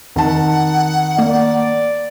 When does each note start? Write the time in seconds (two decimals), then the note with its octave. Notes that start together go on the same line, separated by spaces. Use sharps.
0.16 F2 D#3 F#5 A5
1.19 A#3 D5